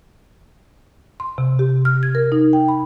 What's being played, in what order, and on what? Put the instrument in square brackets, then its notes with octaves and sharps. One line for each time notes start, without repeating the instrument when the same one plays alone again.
[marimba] C6
C3
G4
F6
G#6
A#4
D#4
G5
B5